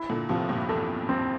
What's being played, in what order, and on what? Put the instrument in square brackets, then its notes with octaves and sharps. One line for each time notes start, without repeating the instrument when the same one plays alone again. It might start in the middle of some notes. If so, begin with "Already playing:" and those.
Already playing: [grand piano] E4
[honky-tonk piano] A#2 D3
[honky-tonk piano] A2 C3 [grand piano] F3
[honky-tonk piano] G2 A#2
[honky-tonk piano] E2 G2 [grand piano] A4
[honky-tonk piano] F2 [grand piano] C4